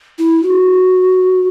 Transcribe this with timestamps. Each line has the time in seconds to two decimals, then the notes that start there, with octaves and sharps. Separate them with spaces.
0.19 E4
0.43 F#4